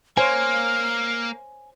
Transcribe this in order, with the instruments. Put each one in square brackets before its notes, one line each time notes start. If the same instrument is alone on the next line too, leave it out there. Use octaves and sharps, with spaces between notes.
[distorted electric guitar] A#3 [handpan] C5 C#5 [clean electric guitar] G#5 [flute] F6